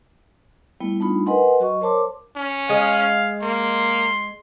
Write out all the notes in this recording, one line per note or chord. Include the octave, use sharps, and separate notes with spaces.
G3 A3 B3 E4
G3 A3 D4 D#4 F4 B5
A#4 B4 D#5 F#5 G#5 C6
F#3 F#4 D#5 C#6
A#4 C5 C#5 A5 C6 D6
C#4
G#3 D#5 F5
A#3 C6